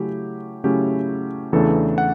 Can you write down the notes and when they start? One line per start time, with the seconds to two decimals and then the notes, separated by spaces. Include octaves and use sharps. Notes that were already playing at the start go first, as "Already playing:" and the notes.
Already playing: C#3 F#3 A3 C#4 E4 G4
0.64 C#3 F#3 A3 C#4 E4 G4
1.53 E2 C#3 E3 A3 D4 A4
1.98 F#5